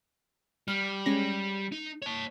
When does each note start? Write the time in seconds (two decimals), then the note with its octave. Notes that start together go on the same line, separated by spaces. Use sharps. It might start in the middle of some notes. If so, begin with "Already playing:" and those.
0.68 G3 F6
1.06 G#3 C#4 A#6
1.72 D#4
2.02 C#5 A5